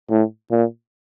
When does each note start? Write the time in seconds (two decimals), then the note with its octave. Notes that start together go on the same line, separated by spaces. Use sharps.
0.10 A2
0.51 A#2